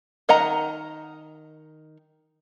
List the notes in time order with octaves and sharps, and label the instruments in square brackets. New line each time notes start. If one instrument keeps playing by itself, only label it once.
[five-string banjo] D#3 D#5 F#5 A#5